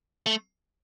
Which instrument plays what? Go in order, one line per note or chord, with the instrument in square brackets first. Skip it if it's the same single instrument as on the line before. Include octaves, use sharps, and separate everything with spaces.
[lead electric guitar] A3